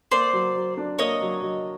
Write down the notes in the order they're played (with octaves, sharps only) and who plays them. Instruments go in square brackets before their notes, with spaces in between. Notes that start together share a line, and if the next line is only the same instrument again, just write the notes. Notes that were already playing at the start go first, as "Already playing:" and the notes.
[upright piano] A#3 [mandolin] C5 D5
[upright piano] F#3
F#3
D4
[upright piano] A#3 [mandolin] C#5 D#5
[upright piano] F#3
F#3